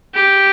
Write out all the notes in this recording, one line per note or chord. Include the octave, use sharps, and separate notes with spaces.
G4